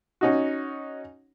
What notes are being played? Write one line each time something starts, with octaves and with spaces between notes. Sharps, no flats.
C#4 D#4 F#4